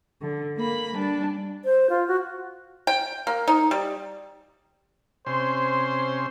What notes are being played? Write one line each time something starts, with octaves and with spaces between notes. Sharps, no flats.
D3
A#3 B5
G3 D4
C5
F4
F#4
G5
A#3
D#4
G3
C3 C#4 C5 C6